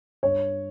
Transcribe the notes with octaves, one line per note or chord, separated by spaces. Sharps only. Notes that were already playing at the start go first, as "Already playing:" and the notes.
G2 C#5